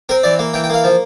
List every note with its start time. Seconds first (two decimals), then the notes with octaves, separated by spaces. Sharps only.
0.09 C4 A#4
0.23 E3 D5
0.39 A#3
0.54 E3 G5
0.64 G5
0.69 A#3 F5
0.84 F3